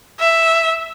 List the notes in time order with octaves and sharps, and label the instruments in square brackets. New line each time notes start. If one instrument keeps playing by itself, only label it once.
[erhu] E5